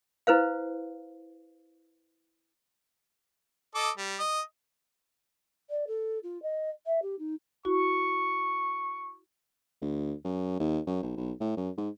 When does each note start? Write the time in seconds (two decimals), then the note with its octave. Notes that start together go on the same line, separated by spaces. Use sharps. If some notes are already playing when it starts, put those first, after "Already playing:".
0.27 E4 B4 C5 F5
3.75 A4 D#5 D6
3.97 G3
4.19 D#5
5.70 D5
5.87 A4
6.23 F4
6.42 D#5
6.86 E5
7.02 G4
7.19 D#4
7.65 E4 F#4 C#6
9.82 D2
10.25 F#2
10.60 D#2
10.87 F#2
11.03 B1
11.17 B1
11.41 A2
11.57 F#2
11.78 G#2